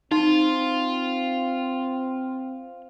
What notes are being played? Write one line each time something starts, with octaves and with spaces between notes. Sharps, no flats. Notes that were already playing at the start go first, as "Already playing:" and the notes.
C4 D#4 F4 C6